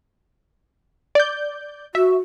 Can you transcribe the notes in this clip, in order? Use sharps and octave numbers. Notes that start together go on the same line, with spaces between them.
D5 G6
F#4 E5